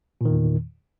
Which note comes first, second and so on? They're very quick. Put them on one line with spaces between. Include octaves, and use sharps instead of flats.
A#2 D#3 E2